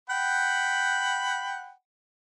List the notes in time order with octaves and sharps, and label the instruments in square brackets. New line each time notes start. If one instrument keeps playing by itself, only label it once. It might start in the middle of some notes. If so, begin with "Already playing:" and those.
[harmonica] F#5 G5 B5